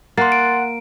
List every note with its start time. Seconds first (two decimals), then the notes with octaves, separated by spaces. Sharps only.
0.18 A#3 F#5 C6 A6
0.32 D7